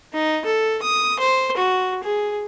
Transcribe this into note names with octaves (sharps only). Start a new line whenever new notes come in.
D#4
A4
D#6
C5
F#4
G#4